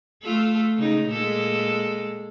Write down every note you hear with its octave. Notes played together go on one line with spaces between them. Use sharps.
A3 F4 A4
C#3 G#3 D#4
A#2 G#3 A4